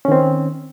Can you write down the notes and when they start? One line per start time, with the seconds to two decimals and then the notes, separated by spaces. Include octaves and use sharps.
0.05 C#4
0.08 D#3
0.12 C4